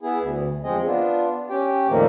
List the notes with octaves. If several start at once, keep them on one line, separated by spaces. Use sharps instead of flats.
B3 E4 G#4
D2
E2 F3 G#3 C4 G#4 D#5
B3 D4 F4
C#4 G4 G5
F2 A#2 D#3 F3 A3 A#3